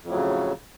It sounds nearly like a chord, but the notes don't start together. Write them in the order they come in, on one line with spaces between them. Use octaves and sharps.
F2 A2 F#3 C#3